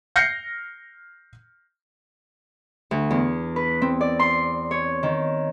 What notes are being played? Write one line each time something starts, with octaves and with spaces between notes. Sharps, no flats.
F6 G6 A#6 C7 C#7
D2
E2
B4
C4
D5
C6
C#5
D#3